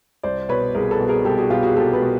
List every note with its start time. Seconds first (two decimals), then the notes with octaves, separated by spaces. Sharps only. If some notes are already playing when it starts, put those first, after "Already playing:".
0.23 C2 C5 D5
0.49 B2 B4 C#5
0.75 C2 G#4 A#4
0.91 A4 B4
1.00 B2
1.08 G#4 A#4
1.25 C2 G4 A4
1.38 F#4 G#4
1.50 B2 F4 G4
1.63 F#4 G#4
1.77 C2 G4 A4
1.93 A4 B4
2.02 B2